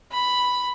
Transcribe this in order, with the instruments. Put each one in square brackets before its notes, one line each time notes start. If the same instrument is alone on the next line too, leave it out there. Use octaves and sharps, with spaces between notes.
[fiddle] B5